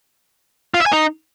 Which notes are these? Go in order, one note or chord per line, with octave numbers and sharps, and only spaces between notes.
F4
E5
G#5
D#4